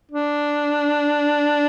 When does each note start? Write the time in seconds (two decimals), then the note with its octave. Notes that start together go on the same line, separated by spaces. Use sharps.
0.11 D4